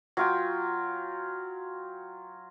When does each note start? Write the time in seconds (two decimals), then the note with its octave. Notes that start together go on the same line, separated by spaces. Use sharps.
0.17 F#3 F4 G5